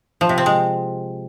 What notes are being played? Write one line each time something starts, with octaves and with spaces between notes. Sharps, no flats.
F3
C3
C4
G#3